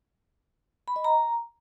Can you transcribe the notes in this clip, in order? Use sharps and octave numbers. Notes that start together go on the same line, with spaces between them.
B5
D#5
A#5